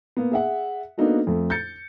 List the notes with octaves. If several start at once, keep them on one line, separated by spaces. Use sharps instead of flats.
A#3 B3
G#4 E5 F#5
A#3 B3 D4 D#4 F#4 A4
F2 A3
G6 A6 C#7